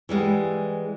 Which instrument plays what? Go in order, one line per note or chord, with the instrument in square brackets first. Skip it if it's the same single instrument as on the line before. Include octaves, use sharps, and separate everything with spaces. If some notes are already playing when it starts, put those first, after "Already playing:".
[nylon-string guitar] E3 G3 G#3 B3